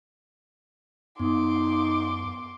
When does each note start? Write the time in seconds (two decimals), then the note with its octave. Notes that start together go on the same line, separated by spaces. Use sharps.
1.19 F#2 B3 D#4 C6 D6